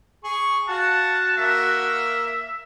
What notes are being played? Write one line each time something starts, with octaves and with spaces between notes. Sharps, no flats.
G#4 C#6
F#4 F5 F#5 A5
A#3 E5